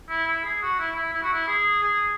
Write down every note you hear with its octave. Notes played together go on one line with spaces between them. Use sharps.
E4
E4
G#4
F#4
E4
E4
E4
F#4
E4
G#4
G#4